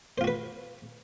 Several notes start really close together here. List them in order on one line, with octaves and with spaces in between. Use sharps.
C5 F4 F#4 B4